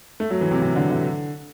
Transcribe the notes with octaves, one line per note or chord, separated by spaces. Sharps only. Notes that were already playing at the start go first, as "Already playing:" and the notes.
A3
F#3
E3
C3
C3
D3
D3